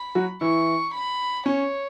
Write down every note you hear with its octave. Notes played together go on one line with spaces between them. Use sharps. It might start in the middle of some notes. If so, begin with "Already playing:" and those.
Already playing: B5
F#3 F#4
E3 E4 C#6
B5
C#4 C#5